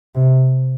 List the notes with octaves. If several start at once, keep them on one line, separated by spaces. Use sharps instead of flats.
C3